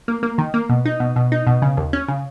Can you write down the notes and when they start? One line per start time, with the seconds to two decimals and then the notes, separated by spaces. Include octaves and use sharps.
0.08 A#3
0.23 A#3
0.38 D#3
0.54 A#3
0.70 B2
0.85 D#4
1.00 B2
1.16 B2
1.32 D#4
1.47 B2
1.62 C#3
1.77 D#2
1.93 C#4
2.08 C#3